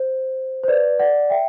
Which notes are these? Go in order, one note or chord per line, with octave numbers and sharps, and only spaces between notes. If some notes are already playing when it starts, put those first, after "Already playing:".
Already playing: C5
C5
B4 D5
D5 F#5
E5 G5